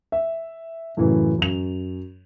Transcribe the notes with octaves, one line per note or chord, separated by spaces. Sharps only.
E5
F#2 A2 C#3 E3
F#2 F7